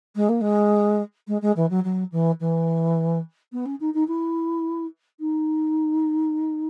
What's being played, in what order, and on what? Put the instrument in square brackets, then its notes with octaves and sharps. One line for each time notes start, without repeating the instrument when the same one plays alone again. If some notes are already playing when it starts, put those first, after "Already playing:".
[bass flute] G#3
A#3
G#3
G#3
G#3
E3
F#3
F#3
E3
E3
B3
C#4
D#4
D#4
E4
D#4